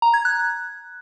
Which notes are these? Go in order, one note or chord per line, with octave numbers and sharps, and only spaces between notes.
A#5
G#6
F#6